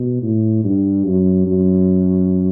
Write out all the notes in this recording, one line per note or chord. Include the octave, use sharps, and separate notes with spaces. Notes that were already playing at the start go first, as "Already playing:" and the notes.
Already playing: B2
A2
G2
F#2
F#2